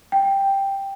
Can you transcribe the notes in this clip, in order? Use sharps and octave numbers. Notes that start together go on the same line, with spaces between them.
G5